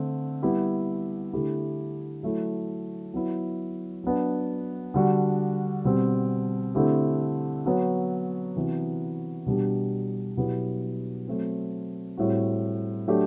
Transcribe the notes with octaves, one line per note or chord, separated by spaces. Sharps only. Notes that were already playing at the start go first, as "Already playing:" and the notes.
Already playing: D3 A3 C4
G3 B3 E4 G4
D3 A3 E4 G4
F#3 A3 E4
F#3 B3 E4
F#3 B3 D4
D3 G3 D4 F#4
B2 G3 C4
D3 A3 C4 E4 G4
F#3 B3 F#4
C3 E3 B3 F#4
B2 G3 D4 G4
B2 F#3 B3 E4 G4
F#3 A3 C4
A2 G3 C4 F#4
F#3 A3 D4 G4